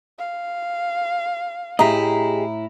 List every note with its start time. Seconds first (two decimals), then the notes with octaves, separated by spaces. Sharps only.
0.18 F5
1.79 A2 E4 G4 G#4 D#5 A#5